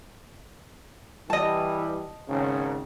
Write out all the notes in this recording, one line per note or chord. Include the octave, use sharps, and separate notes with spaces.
E3 G3 E4 D#5 A5
G#1 C#3